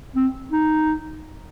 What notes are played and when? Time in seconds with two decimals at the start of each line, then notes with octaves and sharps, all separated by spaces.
0.16 C4
0.52 D#4